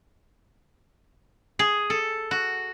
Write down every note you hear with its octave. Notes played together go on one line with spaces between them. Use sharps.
G#4
A4
F#4